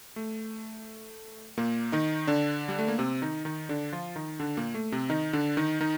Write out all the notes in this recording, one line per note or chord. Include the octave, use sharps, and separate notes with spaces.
A3
A#2 A#3
D#3 D#4
D3 D4
G3
A3
A#3
C3 C4
D#3 D#4
D#3 D#4
D3 D4
F3 F4
D#3 D#4
D3 D4
A#2 A#3
A3
C3 C4
D#3 D#4
D3 D4
D#3 D#4
D#3 D#4